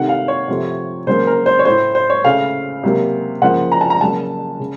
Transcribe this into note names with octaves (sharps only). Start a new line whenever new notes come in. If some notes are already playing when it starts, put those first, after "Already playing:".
Already playing: C3 D#3 A3 F#5
F5
C#5
C3 F3 A3
C#3 F#3 A#3 C5
A#4
C5
C#5
A2 A3 C5
C5
C#5
C#3 A3 F5
C3 F#3 A#3
C#3 F3 A#3 F#5
A#5
A5
A#5
C#3 F#3 A#3 A5
C#3